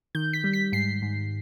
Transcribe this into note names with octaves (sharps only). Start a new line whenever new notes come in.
D#3 G6
B6
G3
B6
G#2 C7
G#2